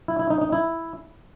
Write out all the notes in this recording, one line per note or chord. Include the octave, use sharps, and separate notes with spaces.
E4
E4
D#4
D#4
E4